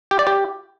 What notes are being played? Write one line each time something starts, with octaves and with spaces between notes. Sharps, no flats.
G4
D5
G4